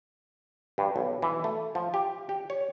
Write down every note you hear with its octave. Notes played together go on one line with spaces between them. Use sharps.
G2
B1
E3
A3
F3
G4
G4
C#5